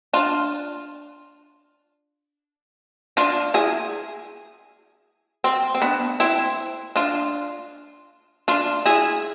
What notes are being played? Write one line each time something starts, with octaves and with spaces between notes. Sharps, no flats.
D4 F4
D4 F4
E4 G#4
C4
C4
B3 D4
C4 E4
D4 F4
D4 F4
E4 G#4